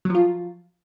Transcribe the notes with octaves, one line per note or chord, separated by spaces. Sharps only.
F3 F#3 F4